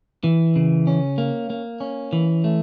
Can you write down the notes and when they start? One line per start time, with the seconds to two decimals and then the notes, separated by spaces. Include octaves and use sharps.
0.24 E3
0.56 C#3
0.87 C#4
1.18 A#3
1.50 A#3
1.80 C#4
2.13 E3
2.44 A3